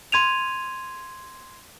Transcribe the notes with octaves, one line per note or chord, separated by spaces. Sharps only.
C6 G#6 D#7 F7